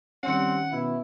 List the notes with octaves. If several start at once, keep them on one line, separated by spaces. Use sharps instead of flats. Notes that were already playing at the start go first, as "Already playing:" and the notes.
D#3 G3 C4 C#4 F#5
B2 E4